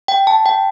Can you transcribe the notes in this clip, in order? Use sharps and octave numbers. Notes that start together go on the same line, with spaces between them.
G5
A5
G5